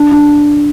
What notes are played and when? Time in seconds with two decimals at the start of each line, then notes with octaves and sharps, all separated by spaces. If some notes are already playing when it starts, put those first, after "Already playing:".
Already playing: D4
0.12 D4